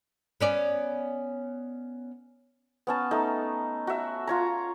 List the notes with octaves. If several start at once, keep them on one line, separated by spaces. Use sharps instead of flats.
B3 C#4 D5
B3 C#4 A5
A3 D#4
F#4 E5
F4 C#5 A#5